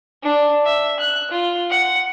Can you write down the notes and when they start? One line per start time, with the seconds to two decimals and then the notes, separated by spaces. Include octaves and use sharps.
0.23 D4
0.65 E5
0.99 F#6
1.31 F4
1.70 F#5